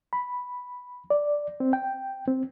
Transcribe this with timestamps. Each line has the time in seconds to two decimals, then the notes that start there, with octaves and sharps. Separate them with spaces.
0.13 B5
1.10 D5
1.60 C4
1.73 G5
2.28 C4